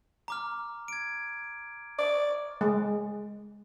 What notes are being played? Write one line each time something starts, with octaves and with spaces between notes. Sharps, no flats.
A#5 D6 F6
G#6 D7
D5
G#3